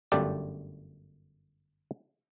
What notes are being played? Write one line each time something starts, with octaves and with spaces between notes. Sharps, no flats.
G1 F#2 A3 D4 G4 D5